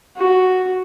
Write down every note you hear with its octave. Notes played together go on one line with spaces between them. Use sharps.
F#4